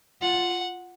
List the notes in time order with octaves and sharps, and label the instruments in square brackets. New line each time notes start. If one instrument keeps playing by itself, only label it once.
[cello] F4 [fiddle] F#5